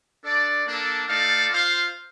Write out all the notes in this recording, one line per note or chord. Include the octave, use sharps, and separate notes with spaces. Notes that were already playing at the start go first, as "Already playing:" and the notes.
D4 A4 D5
A#3 D4 A4
A3 D#4 A4 D5 F5
F4 C5 F5